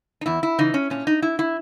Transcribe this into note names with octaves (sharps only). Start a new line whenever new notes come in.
D#4
E2 E4
E4
C#3 E3 D#4
C#4
A#2 C#4
D#4
E4
E4